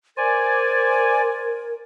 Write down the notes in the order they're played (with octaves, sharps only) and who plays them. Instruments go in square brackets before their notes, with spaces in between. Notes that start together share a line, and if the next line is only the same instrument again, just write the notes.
[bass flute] A#4 [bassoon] C5 [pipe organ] D5 G#5